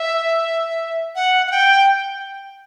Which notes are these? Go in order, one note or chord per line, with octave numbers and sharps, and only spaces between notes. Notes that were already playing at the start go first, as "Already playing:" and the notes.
Already playing: E5
F#5
F#5
G5